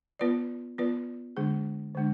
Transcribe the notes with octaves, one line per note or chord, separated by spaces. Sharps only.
B3 F4 B4 D5
B3 F4 B4 D5
D3 G#3 D4 G#4
D3 G#3 D4